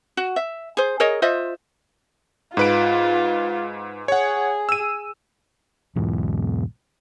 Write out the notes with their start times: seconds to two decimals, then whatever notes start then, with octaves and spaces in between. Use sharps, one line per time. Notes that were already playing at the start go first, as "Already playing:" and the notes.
0.17 F#4
0.36 E5
0.77 G#4 C5
1.00 G#4 A#4 C#5 D#5
1.22 F4 C5 D#5 E5
2.57 G#2 F4 B4 D7
4.08 G#4 C#5 F#5
4.69 E6 D#7
5.96 B1 E2 G#2